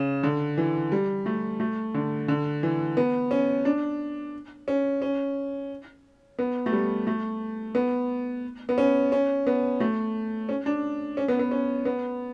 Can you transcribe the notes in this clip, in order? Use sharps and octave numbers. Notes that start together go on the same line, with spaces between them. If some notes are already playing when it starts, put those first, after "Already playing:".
Already playing: C#3
D3
E3
G3
A3
A3
D3
D3
E3
B3
C#4
D4
C#4
C#4
B3
A3
G3
A3
B3
B3
C#4
C#4
B3
A3
C#4
D4
C#4
B3
B3
C#4
B3